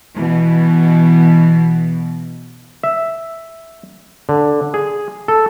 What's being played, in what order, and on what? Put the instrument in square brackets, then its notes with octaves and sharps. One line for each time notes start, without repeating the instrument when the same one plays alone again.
[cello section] B2 E3
[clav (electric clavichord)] E5
D3
G#4
A4